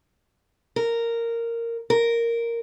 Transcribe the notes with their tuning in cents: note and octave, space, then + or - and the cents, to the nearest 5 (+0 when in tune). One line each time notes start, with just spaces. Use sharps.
A#4 -10
A#4 -5